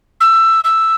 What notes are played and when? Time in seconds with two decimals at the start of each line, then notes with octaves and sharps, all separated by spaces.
0.20 E6
0.64 E6